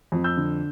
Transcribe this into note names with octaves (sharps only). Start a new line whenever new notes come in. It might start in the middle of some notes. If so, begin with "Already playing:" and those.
F2
E6 G6
D3